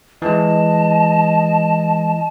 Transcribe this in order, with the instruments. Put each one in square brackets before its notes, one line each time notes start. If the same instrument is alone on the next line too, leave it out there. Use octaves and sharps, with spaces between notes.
[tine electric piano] E3 G#3 [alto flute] D#5 [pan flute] A5